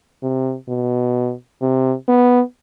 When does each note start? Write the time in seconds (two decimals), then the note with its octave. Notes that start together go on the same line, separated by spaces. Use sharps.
0.23 C3
0.69 B2
1.62 C3
2.09 B3